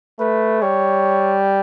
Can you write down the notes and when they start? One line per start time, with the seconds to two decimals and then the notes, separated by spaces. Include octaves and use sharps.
0.20 A3 B4
0.62 G3 C#5